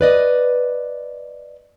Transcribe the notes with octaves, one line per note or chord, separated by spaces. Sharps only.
B4 D5 D#5